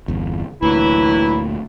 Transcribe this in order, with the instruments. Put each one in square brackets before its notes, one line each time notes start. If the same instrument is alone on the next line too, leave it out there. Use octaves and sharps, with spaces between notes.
[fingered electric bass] G1 E2
[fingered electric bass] D2 A#2 [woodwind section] E3 F#3 E4